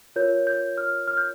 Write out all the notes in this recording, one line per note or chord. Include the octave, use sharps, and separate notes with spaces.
F4 A#4 C#5 G6
G6
F6
F6
G6